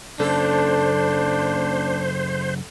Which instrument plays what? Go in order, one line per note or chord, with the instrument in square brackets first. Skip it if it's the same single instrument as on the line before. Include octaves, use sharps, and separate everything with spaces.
[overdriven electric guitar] F#2 C#3 [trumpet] D4 [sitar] A4 [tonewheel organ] C5